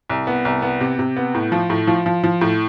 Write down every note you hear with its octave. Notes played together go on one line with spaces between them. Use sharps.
C2
B3
C2
B3
C3
C3
B3
A2
F3
A2
F3
F3
F3
A2